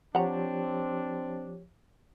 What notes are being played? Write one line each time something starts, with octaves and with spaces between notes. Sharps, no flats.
F3 C4 D4 G4 C#5 F#5 A#5